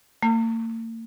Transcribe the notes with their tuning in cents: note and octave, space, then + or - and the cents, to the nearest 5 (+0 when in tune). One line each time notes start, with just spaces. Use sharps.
A#3 -45